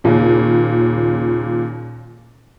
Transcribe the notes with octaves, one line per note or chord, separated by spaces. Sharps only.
D#2 A#2 C#3 C#4